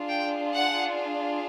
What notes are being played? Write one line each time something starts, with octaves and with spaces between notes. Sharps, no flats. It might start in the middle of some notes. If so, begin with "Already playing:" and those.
Already playing: D4 F4 G#4
G5
F#5